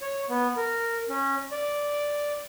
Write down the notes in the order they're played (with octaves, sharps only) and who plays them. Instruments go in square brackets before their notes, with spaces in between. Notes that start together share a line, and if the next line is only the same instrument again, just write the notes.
[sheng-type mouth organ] C#5
B3
A#4
C#4
D5